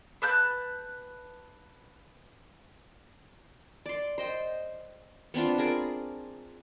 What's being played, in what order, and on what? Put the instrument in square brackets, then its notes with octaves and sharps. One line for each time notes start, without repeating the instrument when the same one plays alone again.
[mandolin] B4 A5 F#6 G6
[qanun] D5 C6
C5 D#5 G5
B3 C4 D4 F4
F4 G#4 A#4 D5